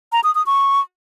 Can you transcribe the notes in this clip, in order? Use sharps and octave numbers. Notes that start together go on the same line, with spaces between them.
A#5
D#6
D#6
C#6